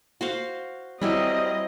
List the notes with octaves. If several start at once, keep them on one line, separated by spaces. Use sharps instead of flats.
F#4 C5 F5
F#3 G3 C4 E4 G#4 D#5